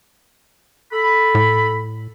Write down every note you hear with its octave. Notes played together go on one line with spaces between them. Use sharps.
A4 B5
A2